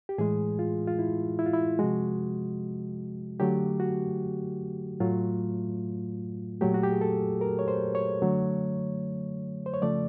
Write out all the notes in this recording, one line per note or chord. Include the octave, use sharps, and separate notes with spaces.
G4
A2 E3 G#3 G#4
F4
F4
E4
E4
F4
E4
C3 F3 G#3 F#4
D3 F#3 A3 G4
F#4
A2 F#3 A3 F4
A#2 F#3 A3 G4
F#4
G4
G#4
A4
A#4
C#5
C5
C#5
D3 F#3 A3
C5
C#5
C#3 F3 A3 D5